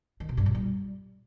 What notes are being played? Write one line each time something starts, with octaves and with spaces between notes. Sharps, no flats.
D#3
B2
G2
A#2
G3